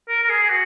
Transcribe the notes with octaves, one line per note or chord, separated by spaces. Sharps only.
A#4
A#4
G#4
G#4
F#4